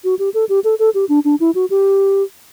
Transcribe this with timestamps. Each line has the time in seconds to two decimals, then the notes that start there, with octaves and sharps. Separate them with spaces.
0.04 F#4
0.19 G4
0.34 A4
0.49 G4
0.64 A4
0.79 A4
0.95 G4
1.09 D4
1.25 D4
1.40 E4
1.55 F#4
1.70 G4